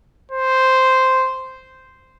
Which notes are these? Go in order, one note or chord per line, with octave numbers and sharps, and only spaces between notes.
C5